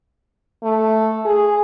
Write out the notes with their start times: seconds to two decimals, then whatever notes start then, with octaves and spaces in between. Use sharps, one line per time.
0.63 A3
1.25 G#4